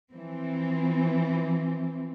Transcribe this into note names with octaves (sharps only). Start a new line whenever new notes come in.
E3 F3 C4